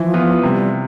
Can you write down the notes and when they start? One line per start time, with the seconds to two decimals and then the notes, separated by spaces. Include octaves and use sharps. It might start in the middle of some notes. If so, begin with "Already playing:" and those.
Already playing: E3 F3
0.14 B3 F4
0.42 C3 G3